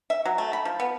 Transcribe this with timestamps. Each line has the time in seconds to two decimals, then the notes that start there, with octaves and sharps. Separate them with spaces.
0.10 E5
0.25 F#3
0.38 A3
0.53 B5
0.65 F3
0.80 B3